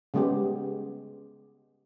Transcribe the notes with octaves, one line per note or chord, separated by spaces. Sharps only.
C#3 G3 G#3 B3 G4